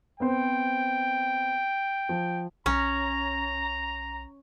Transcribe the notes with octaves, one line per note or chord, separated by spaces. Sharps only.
B3 C4 C5 G5
F3
B1 C#4 A#5